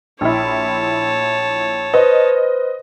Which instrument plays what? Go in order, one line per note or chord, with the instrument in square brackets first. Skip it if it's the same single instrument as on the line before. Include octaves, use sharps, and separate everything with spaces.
[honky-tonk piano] A#1 E4 [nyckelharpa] C#5 A5
[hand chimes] B4 C5 [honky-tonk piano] D#5